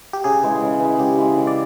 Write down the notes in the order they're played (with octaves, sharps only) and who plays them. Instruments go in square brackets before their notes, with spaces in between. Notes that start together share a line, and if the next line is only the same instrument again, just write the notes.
[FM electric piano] G4
[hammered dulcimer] C#3 [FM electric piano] G#4
[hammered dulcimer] E3 G#3
C#3
E3 G#3
[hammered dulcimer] C#3 [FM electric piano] G4
[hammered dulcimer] E3 G#3
C#3
[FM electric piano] D5